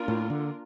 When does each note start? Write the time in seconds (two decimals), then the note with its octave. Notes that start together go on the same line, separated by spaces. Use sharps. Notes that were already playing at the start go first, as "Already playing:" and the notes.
Already playing: A#3 D4 F4 A#4
0.08 A2
0.30 D3